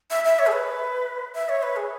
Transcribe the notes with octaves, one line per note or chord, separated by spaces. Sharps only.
E5
E5
C#5
G#4
B4
E5
C#5
B4
G#4